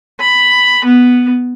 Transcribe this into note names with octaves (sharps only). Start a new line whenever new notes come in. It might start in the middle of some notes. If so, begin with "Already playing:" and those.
B5
B3